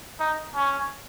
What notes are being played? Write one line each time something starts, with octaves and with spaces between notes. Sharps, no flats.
D#4
C#4